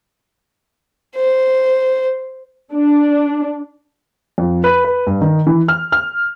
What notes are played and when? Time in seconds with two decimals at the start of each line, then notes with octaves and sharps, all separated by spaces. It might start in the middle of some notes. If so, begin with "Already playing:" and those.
1.16 C5
2.73 D4
4.38 F2
4.64 B4
4.85 B4
5.07 G2
5.21 D#3
5.47 E3
5.68 F6
5.92 F6